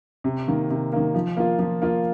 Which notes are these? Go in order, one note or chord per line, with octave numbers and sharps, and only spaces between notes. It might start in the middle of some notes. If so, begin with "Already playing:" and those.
C3
D#3 A#3
C3
D#3 A#3
F3
A#3 F4
F3
A#3 F4